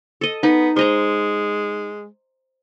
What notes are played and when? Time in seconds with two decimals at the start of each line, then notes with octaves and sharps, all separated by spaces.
0.21 A4 D#5
0.43 B3 D#4
0.76 G#3 C5 D#5 A#5